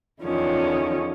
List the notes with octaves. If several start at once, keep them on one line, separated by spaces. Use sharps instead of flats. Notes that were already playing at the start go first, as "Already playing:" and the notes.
E2 D3 D#3 F3 C#4